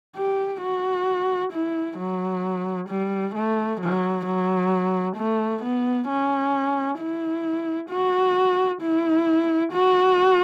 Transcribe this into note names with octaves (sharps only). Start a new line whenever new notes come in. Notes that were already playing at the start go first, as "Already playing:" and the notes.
G4
F#4
E4
F#3
G3
A3
F#3
F#3
A3
B3
C#4
E4
F#4
E4
F#4